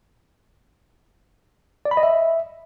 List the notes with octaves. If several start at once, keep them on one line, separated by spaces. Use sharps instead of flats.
D5
B5
D#5
E5